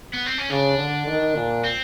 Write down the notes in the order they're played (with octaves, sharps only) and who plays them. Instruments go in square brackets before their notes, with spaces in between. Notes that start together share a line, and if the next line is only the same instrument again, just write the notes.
[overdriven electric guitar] B3
C4
C#4
[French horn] C#3 [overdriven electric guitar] D4
[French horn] D3
D#3
A#2
[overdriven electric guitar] C4